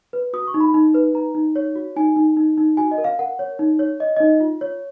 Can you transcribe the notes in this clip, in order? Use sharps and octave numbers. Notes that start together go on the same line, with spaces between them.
B4
F#4 D#6
C#6
D#4
B5
D#4
B4
D#4 A#5
D#4
C#5
F#4
D#4 G#5
D#4
D#4
D#4
F#4 G#5
D#5
A#4
F5
A#4 F#5
C#5
D#4
C#5
C#5 D#5
D#4 D#5
F4
C#5